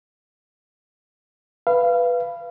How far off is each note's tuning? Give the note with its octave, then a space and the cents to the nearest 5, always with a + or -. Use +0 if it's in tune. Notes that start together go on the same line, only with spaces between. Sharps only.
B4 +0 F5 -25